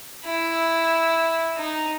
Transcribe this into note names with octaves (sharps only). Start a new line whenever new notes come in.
E4
D#4